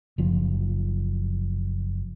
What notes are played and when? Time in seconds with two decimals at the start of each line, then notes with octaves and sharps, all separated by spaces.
0.18 F#1 F3